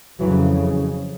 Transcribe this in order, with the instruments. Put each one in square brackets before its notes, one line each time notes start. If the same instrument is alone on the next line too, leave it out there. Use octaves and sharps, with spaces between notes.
[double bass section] F2 C#3 E3 F#3